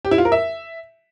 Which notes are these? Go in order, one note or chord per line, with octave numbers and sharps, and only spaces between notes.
G4
E4
F4
A#4
E5